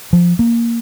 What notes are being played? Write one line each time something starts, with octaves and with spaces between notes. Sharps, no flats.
F3
A#3